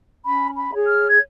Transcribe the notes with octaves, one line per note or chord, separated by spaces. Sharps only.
C#4 B5
B5
G#4 C#5
F6
G#6